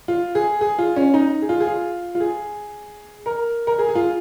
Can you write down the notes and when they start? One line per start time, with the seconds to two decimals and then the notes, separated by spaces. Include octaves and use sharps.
0.08 F4
0.35 G#4
0.61 G#4
0.79 F4
0.96 C#4
1.14 D#4
1.42 G#4
1.49 F4
1.60 G#4
1.67 F4
2.15 F4
2.20 G#4
3.26 A#4
3.67 A#4
3.79 G#4
3.89 G#4
3.95 F4